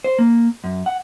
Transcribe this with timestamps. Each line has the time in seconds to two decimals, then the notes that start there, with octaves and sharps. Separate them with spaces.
0.04 C5
0.19 A#3
0.64 F#2
0.86 F#5